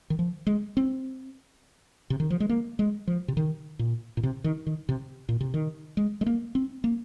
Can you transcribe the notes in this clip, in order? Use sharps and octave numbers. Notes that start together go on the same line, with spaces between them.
D#3
F3
G#3
C4
C3
D#3
F3
G#3
A#3
G#3
F3
C3
D#3
A#2
A#2
C3
D#3
D#3
C3
A#2
C3
D#3
G#3
G#3
A#3
C4
A#3